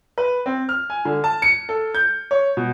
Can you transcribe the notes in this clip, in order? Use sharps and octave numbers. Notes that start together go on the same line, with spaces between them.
B4
C4
F6
G#5
D3
A5
C#7
A4
G6
C#5
B2